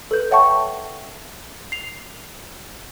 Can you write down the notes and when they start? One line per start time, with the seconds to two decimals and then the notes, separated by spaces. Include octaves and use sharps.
0.11 A4 B4 G6
0.31 C#5 E5 F#5 G5 A5 C#6
1.72 C7 F7